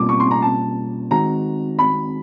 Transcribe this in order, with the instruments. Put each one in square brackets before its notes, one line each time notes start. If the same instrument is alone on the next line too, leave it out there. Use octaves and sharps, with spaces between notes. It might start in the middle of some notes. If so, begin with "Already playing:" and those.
Already playing: [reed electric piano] B2 G3 A#3 C#4 F4 [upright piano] D6
[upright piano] C#6
C6
A#5
A5
[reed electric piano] D#3 G#3 C4 D#4 F#4 [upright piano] A#5
[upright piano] B5